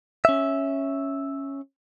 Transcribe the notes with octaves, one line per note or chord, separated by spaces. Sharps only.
C#4 E5